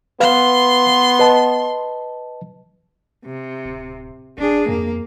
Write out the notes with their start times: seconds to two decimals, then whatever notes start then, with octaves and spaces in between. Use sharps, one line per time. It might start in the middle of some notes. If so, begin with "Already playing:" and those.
0.20 B3 B4 F5 C6
1.19 B4 D#5 A5
3.25 C3
3.65 D1
4.38 D#1 D4 G#4
4.68 F2 A#3